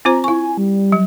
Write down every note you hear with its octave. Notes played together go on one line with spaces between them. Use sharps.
C4 F4 C5 A#5
E4 G#5 C#6
G3
F#3